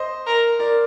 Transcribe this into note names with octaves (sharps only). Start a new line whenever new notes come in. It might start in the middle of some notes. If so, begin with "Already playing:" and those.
Already playing: C5 D#5
A#4
A#4 D5